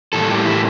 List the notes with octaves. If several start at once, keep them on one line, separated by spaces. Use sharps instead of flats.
A2 E3 G3 A#3 A4
G4
E4